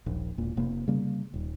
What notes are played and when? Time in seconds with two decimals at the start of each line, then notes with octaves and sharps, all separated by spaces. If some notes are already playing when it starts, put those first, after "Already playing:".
0.06 D#1 A#1
0.38 E1 A#2
0.57 F1 C3 A#3
0.87 C#3 G3 A#3
1.34 D#1